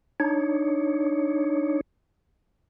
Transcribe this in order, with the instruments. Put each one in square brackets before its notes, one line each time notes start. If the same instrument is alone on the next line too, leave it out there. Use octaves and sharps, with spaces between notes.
[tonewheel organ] D4 D#4 C#5